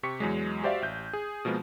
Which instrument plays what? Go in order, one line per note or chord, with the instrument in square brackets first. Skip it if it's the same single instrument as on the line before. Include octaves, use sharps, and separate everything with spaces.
[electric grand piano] C3 G4 C#6 B6 C#7
E2 F#3 G#3
F#4 G4 C5 D5 E5 F5
A1 G6
G#4
B2 F3 G#3 A#3 B3